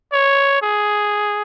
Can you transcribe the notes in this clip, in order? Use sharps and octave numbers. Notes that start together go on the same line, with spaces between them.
C#5
G#4